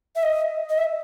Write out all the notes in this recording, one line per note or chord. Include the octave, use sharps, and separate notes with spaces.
E5
D#5
D#5
E5